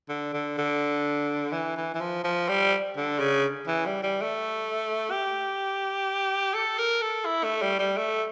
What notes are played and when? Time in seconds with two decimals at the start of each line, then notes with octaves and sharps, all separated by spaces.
0.09 D3
0.34 D3
0.58 D3
1.52 E3
1.77 E3
1.95 E3
2.00 F3
2.24 F3
2.49 G3
2.97 D3
3.20 C#3
3.67 E3
3.86 G3
4.03 G3
4.22 A3
5.11 G4
6.54 A4
6.78 A#4
7.02 A4
7.25 E4
7.44 A3
7.62 G3
7.79 G3
7.97 A3